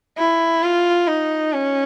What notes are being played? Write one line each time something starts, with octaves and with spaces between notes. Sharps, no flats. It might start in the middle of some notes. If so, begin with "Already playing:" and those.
E4
F4
D#4
C#4